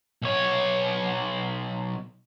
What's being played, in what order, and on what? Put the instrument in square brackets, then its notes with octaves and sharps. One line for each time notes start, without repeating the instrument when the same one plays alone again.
[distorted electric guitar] B1 C#5